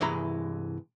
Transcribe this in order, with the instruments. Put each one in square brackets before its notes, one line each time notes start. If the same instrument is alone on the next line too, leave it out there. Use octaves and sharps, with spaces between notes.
[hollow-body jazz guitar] C2 G2 E3 G#3 A#5 B5